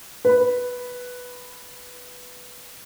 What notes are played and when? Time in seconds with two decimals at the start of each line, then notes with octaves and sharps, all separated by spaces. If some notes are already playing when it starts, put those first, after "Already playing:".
0.25 B4 B5